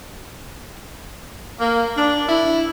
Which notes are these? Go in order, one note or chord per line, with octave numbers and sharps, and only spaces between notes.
A#3
D4
E4